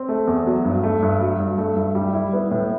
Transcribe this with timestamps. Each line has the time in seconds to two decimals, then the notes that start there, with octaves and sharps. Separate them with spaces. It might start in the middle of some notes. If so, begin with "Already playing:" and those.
Already playing: C4
0.09 A3
0.27 E2
0.46 F#3
0.64 G2
0.83 A3
1.03 G2
1.21 F#3
1.40 G2
1.58 A3
1.76 G2
1.95 G3
2.14 E4
2.33 B3
2.51 A2